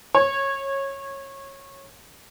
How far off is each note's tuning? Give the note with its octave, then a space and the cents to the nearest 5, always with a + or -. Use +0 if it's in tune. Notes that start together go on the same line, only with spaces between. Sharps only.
C#5 -20